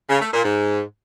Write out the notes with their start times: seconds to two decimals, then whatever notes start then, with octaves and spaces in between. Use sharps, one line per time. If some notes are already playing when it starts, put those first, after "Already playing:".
0.10 C#3
0.21 A3
0.33 A#2
0.44 G#2